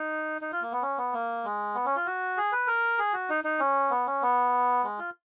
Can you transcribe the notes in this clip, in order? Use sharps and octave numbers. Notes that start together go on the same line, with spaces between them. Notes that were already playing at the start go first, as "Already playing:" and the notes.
Already playing: D#4
D#4
F4
A#3
B3
C#4
B3
A#3
G#3
B3
C#4
F4
F#4
G#4
B4
A#4
G#4
F#4
D#4
D#4
C#4
B3
C#4
B3
G#3
F4